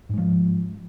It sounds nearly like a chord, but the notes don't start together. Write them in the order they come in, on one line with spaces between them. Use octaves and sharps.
G#2 G#3 F3